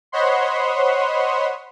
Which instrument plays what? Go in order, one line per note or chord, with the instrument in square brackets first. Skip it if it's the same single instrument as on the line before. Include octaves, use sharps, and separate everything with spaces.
[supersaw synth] C5 C#5 D#5 F#5 B5 C6